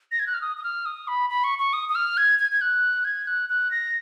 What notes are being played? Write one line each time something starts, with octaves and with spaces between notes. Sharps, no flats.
A#6
G#6
F#6
F6
D#6
D#6
F6
D#6
B5
B5
C#6
C#6
D#6
D#6
F6
G#6
G#6
G#6
F#6
G#6
F#6
F#6
A#6